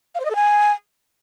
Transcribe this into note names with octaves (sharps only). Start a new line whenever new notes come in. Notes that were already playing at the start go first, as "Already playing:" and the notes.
F5
C5
D#5
A4
G#5